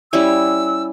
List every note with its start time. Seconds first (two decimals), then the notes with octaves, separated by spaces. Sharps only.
0.13 G3 C#4 E4 E6